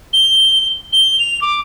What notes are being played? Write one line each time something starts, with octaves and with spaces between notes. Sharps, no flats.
G7
G7
F7
D6